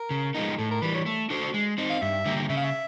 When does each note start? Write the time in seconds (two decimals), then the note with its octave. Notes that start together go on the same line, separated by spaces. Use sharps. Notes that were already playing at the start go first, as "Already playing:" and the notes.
Already playing: A#4
0.10 C#3
0.35 F3 G#3 B3 D#4
0.58 A2 A4
0.71 A#4
0.82 E3 G3 B4
0.95 C#5
1.06 A3
1.30 D4 F#4 A4 C5
1.54 G#3
1.78 C4 D#4
1.90 F5
2.02 G2 E5
2.26 D3 G3 A#3
2.50 C#3 E5
2.57 F5
2.65 E5